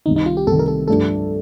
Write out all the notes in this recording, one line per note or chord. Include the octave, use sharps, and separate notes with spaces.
C2 C3 D#3 D#4
D#4
F4
G4
C2 C3 D#3 A4
A#4
A4
G2 F3 A3 D4 G4 A4